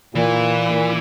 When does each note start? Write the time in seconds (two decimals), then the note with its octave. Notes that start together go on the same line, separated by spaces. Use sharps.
0.15 A#2 E3
0.72 A#2